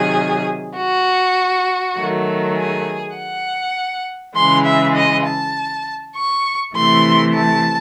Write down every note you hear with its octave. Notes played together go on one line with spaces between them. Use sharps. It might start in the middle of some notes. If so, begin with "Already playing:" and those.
Already playing: C3 D#3 F#3 G#4
F#4
D#3 F#3 A3
G#4
F#5
C#3 E3 G#3 C6
E5
D#5
A5
C#6
C3 E3 A3 C6
A5